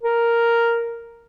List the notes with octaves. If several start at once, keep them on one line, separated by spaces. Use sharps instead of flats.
A#4